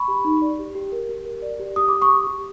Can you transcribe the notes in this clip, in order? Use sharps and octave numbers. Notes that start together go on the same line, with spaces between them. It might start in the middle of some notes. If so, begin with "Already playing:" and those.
Already playing: B5 C#6
G4
D#4
D5
G4
G4
A#4
G4
A#4
D5
G4
G4 D#6
G4 D6
C#6 D#6
G4
G4